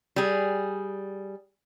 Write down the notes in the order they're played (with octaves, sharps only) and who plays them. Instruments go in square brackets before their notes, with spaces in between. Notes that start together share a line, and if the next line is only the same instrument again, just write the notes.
[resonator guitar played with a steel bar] G3 G#4